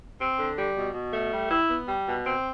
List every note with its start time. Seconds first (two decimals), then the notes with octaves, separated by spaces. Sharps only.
0.20 C4
0.38 D3
0.58 G3
0.76 B2
0.94 B2
1.13 A3
1.32 G3
1.51 E4
1.69 B3
1.88 G3
2.07 B2
2.26 C4